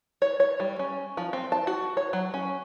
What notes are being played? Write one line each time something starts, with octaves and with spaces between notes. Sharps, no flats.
C#5
C#5
G3
C#4
F3
C4
A5
F#4
C#5
F#3
C#4